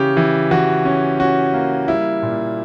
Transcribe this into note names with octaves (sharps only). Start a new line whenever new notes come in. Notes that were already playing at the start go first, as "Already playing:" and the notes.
Already playing: C#3 E3 C#4 G4
E3
E3 F#4
C#4
C#4 F#4
A#3
G3 E4
A#2